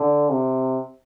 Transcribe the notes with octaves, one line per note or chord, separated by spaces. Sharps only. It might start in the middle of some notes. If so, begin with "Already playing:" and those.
Already playing: D3
C3